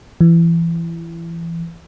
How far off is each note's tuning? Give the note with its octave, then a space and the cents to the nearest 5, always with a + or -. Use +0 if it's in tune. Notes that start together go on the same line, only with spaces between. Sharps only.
E3 +25